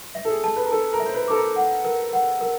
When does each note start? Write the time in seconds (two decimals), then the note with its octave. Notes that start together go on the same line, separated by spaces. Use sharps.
0.15 E5
0.25 A4
0.30 G#4
0.44 A5
0.56 B4
0.64 A#4
0.71 A4 A5
0.93 A#4
1.00 E5
1.06 C5
1.14 B4
1.28 A4 D6
1.36 A#4
1.56 F#5
1.85 A#4
2.13 F#5
2.41 A#4